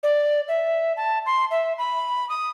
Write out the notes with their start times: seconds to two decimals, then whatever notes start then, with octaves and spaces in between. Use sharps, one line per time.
0.03 D5
0.48 E5
0.97 A5
1.26 C6
1.51 E5
1.78 B5
2.29 D#6